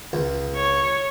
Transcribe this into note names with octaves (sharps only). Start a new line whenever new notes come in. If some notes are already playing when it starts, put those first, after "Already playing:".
C#2
C#5